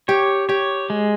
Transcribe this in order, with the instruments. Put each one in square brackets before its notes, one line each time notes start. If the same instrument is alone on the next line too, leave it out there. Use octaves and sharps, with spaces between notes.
[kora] G4 [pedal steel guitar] C#5
[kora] G4 [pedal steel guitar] C#5
[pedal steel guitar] G#3